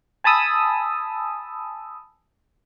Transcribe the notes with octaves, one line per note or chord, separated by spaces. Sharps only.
G#5 A5 B5 D#6 E6